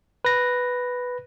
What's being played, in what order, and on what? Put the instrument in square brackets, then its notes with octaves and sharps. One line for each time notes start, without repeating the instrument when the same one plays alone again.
[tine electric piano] B4 A#6